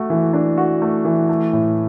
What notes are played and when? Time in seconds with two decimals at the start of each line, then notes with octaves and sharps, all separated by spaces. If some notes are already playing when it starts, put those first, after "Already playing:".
Already playing: A3 F#4
0.10 E3
0.33 D4
0.58 F#4
0.82 A3
1.05 E3
1.29 A3
1.53 A2